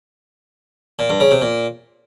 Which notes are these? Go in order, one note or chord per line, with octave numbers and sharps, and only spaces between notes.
A#2
G2
C#3
C3
A#2